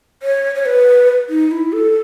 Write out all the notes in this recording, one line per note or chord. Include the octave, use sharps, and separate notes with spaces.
C#5
C#5
B4
D#4
E4
A4